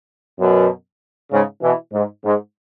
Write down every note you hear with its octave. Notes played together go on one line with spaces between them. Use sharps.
F#2 B2
G#2 C#3
B2 E3
G#2
G#2